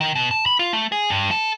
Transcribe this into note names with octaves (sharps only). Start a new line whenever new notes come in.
D#3
B2
A5
B5
F4
A3
G#4
G2
A4